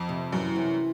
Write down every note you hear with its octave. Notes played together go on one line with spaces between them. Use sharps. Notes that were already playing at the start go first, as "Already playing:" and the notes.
Already playing: F2
C3
F#2 E3
C3